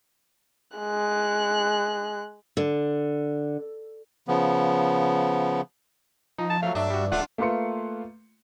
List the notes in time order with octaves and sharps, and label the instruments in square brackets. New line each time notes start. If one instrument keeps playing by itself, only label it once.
[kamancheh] G#3 F#6
[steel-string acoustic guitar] D3
[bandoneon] C#3 F3 B3
[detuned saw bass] F3 [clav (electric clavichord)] D#4
[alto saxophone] A5
[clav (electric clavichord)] F#3 A3 [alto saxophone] F5
[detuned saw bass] G2 [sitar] D4 [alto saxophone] E5
[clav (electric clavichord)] G3 F#4
[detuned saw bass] D1 [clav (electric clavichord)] A3 [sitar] D4 F4 [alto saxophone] F#5
[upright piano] A3 A#3 F4 B4 C6 C#7